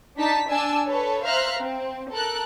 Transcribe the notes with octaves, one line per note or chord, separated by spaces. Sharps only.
D4 D#4 A5 B6
D4 G#5 A5 E6
A4 B4 C#5
C5 E5 F5 A#5 F6 F#6
C4
A4 A#4 F#6